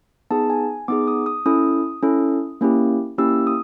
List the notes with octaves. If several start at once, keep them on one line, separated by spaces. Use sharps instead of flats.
B3 D#4 G#4 A5
G#5
B3 D#4 G#4 D6
D#6
D#6
C#4 E4 A4 D#6
C#4 E4 A4
A#3 C#4 E4 G4
A#3 C#4 E4 G4 E6
D#6